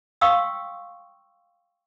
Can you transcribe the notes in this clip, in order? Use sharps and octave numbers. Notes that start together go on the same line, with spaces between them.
F5 G5 C6 C#6 D#6 E6